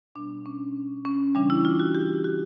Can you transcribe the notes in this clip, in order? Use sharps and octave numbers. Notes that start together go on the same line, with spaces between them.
B2 G3 B3 D4
C#4
C#4
C#3 E3 G3 D4
E4
F4
F#4
G4
F#4